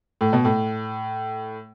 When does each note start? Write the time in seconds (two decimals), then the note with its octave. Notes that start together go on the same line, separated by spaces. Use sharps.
0.21 A2
0.33 B2
0.45 A2